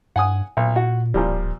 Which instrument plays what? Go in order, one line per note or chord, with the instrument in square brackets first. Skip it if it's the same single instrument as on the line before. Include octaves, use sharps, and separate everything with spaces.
[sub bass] G2 [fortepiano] F#5 G#5 D#6
[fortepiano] B1 [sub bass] A#2
[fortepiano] F#4
[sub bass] D1 [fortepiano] A#2 F3 G3